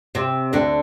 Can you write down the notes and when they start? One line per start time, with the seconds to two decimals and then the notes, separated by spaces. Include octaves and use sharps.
0.15 C3
0.53 D2 D3